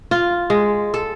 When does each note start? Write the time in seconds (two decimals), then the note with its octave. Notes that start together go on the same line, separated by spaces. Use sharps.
0.11 F4
0.50 G#3
0.94 A4